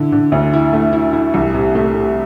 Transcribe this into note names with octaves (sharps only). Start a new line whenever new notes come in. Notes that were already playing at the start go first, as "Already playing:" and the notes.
Already playing: D3 E4
D3
D2
E4
A3
E4
E4
C2
C3
A3
C3